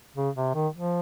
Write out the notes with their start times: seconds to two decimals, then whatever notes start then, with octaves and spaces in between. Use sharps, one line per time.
0.16 C#3
0.36 C3
0.55 D#3
0.74 F3